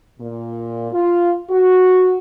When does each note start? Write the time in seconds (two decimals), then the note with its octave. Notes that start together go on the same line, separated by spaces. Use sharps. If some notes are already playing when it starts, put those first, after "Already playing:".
0.20 A#2
0.92 F4
1.50 F#4